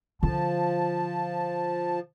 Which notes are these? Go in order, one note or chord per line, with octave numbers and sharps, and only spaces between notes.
D3 F3 F4 A5